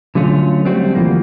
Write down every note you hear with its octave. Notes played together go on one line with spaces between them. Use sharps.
D3 F#3 A3 C#4 F4
F#3 G3 A3 C4 F#4
D2 G2 E3 F3 A#3